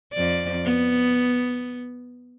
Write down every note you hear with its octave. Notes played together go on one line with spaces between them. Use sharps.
F2 D5
B3